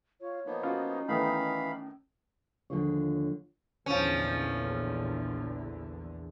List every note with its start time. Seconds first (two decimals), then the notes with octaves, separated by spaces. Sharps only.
0.21 F4 C#5
0.46 F3 A#3 B3 D#4
0.63 C#4 F4 F#4
1.08 A2 D#3 E3 B3 F5 B5
2.70 D#2 D3 F3 F4 G#4 C#5
3.86 A#1 E2 D3 F3 C#4